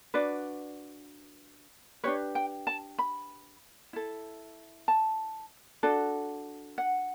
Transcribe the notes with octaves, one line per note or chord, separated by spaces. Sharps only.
D4 F#4 B4 D5
D4 G4 B4 C#5
G5
A5
B5
E4 A4
A5
D4 F#4 A4
F#5